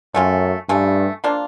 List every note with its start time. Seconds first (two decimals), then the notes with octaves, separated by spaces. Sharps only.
0.14 F#2 A3 C#4 F4
0.69 G2 A3 C#4 F4
1.24 F3 A#3 D4 F4